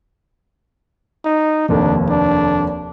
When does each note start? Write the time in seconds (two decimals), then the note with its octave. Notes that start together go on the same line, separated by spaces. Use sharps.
1.25 D#4
1.69 F1 D#2 D4 A4
2.10 D4